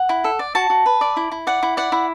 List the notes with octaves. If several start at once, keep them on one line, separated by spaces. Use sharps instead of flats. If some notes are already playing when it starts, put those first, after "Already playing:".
Already playing: F#5
E4
A4
D5
F#4 A5
F#4
B4
D5
E4
E4
D5 F#5
E4
D5 F#5
E4